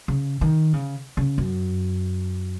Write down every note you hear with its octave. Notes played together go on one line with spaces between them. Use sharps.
C#3
D#3
C#3
C#3
F#2